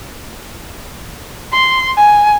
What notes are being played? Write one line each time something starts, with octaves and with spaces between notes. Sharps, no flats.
C6
G#5